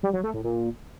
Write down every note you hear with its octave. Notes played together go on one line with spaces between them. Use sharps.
G3
F#3
A3
A2
A#2